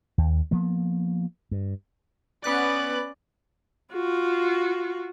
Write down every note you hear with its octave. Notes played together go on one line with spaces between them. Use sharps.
D#2
F3 A#3 B3
G2
B3 C#4 B4 D5 F#6
F4 F#4